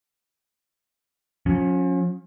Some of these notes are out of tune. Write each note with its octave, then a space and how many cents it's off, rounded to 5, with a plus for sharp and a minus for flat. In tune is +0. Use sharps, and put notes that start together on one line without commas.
F3 +45 C#4 +0